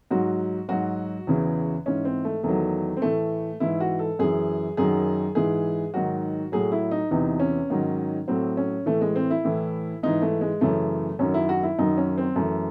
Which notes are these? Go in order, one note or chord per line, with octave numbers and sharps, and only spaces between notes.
G#2 F#3 F#4
G#2 F#3 F#4
E2 C#3 E3
G#2 E3 C#4
C4
A3
E2 D#3 F#3 A3
C4
A2 E3 A3
G#2 E3 E4
F#4
A4
F#2 E3 G#4
F#2 D#3 F#3 G#4
G#2 E3 G#4
G#2 D#3 F#3 F#4
A2 F#3 G#4
E4
D#4
E2 C3 E3 D#4
C#4
G#2 D#3 F#3
A2 F#3 C4
C#4
A2 E3 A3
G#3
C4
E4
A2 E3
G#2 E3 D#4
A3
G#3
F#2 C#3 E3 A3
F#2 D#3 F#3 C#4
E4
F#4
E4
F#2 D#3 F#3 D#4
C#4
C4
F#2 E3 A3